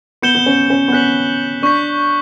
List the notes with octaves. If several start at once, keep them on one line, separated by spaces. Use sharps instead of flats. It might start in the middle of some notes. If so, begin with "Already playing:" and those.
B3 G6 C#7 E7 G7
B3
C#4
C#4
B3
C#4 F#6 B6 F#7
D4 C#6 G6 B6